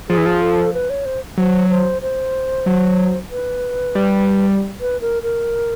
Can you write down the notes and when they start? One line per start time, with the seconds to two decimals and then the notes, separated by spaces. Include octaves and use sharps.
0.09 F3 G#4
0.18 E3
0.26 F3
0.41 A4
0.74 B4
0.90 C#5
1.06 C5
1.38 F#3 C5
1.70 C5
2.02 C5
2.66 F#3
3.31 B4
3.95 G3
4.81 B4
5.01 A#4
5.23 A#4